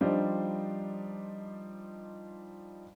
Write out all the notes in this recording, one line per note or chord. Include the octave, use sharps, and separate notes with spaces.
F3 G3 D4 D#4 C5 D#5